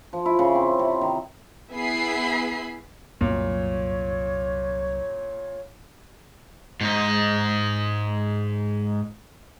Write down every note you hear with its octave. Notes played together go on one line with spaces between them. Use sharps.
F3
E4
C#3
C4
C3
D#3
B3 E4 G#4 E5 B5 C7
C2 F#2 A#2 F#3 C#5
G#2 D#4